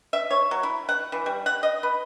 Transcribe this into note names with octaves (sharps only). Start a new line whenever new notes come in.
E5
C#5
F#3
E4
F#5
E3
G3
F#5
D#5
B4